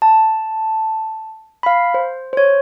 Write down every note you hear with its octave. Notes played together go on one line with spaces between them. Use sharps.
A5
F5 B5
C5
C5 C#5